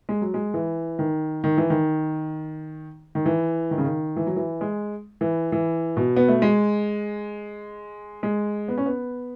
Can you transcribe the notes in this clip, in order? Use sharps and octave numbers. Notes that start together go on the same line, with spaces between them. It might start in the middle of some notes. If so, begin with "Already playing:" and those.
G#3
F#3
G#3
E3
D#3
D#3
E3
D#3
D#3
E3
D#3
C#3
D#3
E3
F#3
E3
G#3
E3
E3
B2
B3
A3
G#3
G#3
B3
C#4
B3